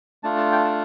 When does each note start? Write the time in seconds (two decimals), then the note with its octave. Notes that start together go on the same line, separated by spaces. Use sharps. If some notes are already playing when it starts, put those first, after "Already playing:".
0.24 A3 D4 F4 A5
0.37 A5
0.52 G5
0.65 A5